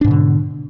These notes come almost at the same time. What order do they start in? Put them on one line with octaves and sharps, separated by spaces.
D4 G#2 B2 D3